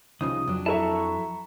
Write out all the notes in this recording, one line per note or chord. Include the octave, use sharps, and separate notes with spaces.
C2 C#3 F3 D#4 D#6
F2 F#3 D4
E4 A4 E5 A5 A#5 C#6